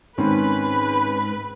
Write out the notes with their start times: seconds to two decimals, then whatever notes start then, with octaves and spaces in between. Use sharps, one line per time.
0.18 G#2 D#3 C4 C#4 B4 B5